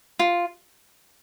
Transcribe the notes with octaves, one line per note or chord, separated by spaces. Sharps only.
F4